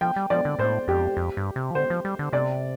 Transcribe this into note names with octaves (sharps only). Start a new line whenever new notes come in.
F3 G5
G3
F3 D5
D3
A2 C5
F2 G4
F2
G2
C3
F3
D3 C5
F3
G3
D3
C3 D5